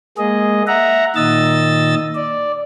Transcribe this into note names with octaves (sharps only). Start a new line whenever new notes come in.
G#3 A#3 G#4 D#5
E5 F#5 A#5
A#2 D#3 D#5 E6 A6
D5